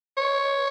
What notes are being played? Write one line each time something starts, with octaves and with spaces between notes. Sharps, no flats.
C#5